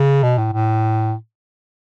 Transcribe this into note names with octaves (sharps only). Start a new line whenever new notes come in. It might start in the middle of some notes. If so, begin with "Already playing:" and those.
Already playing: C#3
B2
A2
A2